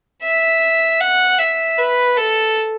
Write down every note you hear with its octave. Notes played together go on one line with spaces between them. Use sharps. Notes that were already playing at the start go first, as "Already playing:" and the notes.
E5
F#5
E5
B4
A4